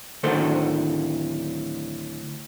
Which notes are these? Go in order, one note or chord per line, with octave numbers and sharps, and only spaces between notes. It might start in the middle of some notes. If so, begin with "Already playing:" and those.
D2 A2 D#3 A4 C5